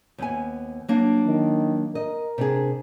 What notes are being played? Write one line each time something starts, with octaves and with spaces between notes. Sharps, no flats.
D#2 B3 G#5
F#3 A#3 D4
D#3
A#4 D#5
C3 D4 G#4